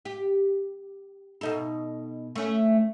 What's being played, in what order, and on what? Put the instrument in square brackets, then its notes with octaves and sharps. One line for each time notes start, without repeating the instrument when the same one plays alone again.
[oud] G4
B2 D#4 A4
A3 C#4